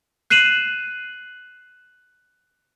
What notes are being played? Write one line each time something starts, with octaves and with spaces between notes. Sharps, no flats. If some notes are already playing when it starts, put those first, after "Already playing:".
F#6 C7 D#7 E7 F#7